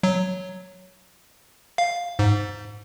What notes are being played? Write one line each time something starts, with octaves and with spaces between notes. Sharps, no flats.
F#3
F5
G#2